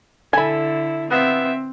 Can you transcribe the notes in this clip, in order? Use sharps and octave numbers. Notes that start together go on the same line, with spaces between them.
D3 E4 A4 G#5 B5
B3 C4 E4 F4 E5